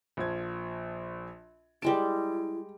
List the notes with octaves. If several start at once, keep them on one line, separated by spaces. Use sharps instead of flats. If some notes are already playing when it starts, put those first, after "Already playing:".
A#1 F3 G#6
G3 G#3 E4 A5 D7